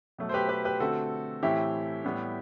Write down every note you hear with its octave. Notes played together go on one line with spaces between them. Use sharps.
B2 F#3 A3
C5
G4 B4
G4 B4
G4 B4
D3 A3 C4 F#4 A4
A2 E3 A3 C4 E4 G4
A2 G3 B3